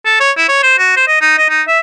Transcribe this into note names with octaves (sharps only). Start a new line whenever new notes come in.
A4
C#5
E4
C#5
C5
F#4
C5
D#5
D#4
D#5
D#4
E5